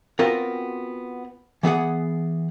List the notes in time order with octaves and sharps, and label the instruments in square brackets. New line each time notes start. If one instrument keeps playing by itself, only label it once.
[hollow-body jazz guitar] B3 C4 F4 F#4 A#4
E3 B3 G#4 F#5